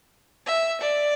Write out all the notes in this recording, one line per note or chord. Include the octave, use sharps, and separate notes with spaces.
E5
D5